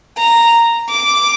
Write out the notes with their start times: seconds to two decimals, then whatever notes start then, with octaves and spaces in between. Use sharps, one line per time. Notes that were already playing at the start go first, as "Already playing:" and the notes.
0.17 A#5
0.89 D6